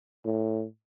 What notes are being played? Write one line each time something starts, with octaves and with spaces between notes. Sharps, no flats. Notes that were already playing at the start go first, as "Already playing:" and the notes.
A2